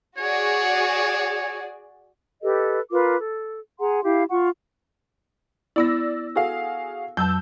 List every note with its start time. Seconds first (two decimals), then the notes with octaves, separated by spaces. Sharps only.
0.18 F#4 G#4 C#5 D5
2.43 G4 A4 B4 D#5
2.91 F4 A#4 B4 D6
3.20 A4
3.79 G#4 F#5 A#5 C6
4.03 E4 G4 F5
4.30 F4 F#5 C#6
5.76 B3 E4 D5 E6 A#6
6.35 F#4 G#4 A4 F5
7.17 F2 F#3 A5 E6 G6